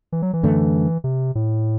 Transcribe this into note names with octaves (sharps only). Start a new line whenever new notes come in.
E3
F#3
E3
F#2 D3 A3
C3
A2